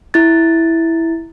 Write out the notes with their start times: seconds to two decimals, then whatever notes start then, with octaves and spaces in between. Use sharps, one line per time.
0.14 E4 A6